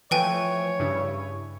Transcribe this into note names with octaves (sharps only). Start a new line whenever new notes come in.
E3 F3 A3 B4 C#5 G5 G#5
G2 C#3 E4